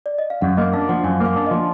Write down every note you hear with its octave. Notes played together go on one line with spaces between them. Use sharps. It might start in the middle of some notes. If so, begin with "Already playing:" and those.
D5
D#5
F5
F#2 F#5
A#3 D#5
D4 F5
F3 F#5
F#2 G#5
A#3
F5
D4
F3 D#5